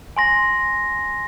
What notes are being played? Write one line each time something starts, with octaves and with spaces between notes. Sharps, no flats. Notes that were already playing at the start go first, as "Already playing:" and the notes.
G#5 C6 A#6